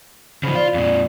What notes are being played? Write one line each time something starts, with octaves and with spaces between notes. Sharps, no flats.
C#3 F3 C5 B5
F4 D5 F5
F2 A#2